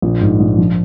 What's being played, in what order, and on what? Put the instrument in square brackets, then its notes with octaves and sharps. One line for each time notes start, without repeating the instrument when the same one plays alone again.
[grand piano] A#1
G#2
A#1
F3